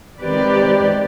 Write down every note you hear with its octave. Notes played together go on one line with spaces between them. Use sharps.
D#3 G#3 C4 G4 B4 D5